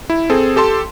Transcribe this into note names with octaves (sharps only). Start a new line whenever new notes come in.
E4
C4 G#4 A4
G4 A4 A5 C6